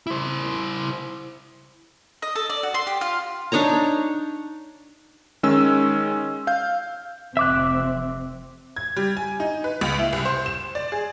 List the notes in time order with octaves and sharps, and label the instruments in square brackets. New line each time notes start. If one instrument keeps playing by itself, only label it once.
[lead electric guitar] E4 C5
[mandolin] D#5
A4
D5
F#4
C6
G4
F4
[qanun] D4 D#4 C#5 A#5
[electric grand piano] D#3 G#3 C#4 E6
F5 G6
[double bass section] F1 F2 C4 [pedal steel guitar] E5 D6 F#6
[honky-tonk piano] G#6
G3
G#5
D#4
B4
C#2
E4
C2
C5
E7
D5
G#4